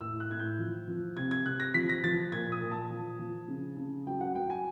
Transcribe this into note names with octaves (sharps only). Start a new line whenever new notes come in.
A2 E6
F#6
A2 G#6
G6
F3
F3
C3 G#6
G#6
C3 F#6
A#6
F3 B6
A#6
F3 A6
A#2 G#6
D#6
A#2
A5
F3
F3
C#3
C#3
F#3 G5
F#5
F#3 G5
G#5